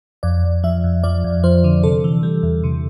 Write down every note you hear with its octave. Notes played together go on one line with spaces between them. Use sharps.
F2 D5
F2
F3 E5
F2
F3 D5
F2
F3 C5
D3
C3 A4
E3
G3
E2
C3